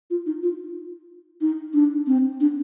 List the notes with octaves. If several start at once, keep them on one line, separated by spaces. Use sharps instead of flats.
F4
D#4
F4
D#4
D4
C4
D4